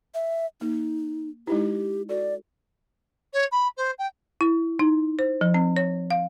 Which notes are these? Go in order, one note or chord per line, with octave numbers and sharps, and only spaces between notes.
E5
A#3 D#4
G#3 D#4 E4 G4
F#4 A4 D5
C#5
B5
C5
G5
E4
D#4
C5
F3
C4
C#5
F5